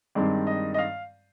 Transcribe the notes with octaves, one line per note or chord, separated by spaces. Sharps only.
G2 D#3 G#3 C4 D5
D#5
D#5
F5